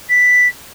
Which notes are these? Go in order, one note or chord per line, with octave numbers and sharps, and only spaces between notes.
B6